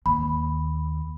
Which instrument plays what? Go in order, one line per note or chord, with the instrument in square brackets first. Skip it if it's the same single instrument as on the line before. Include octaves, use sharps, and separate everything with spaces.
[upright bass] D#2 [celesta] B5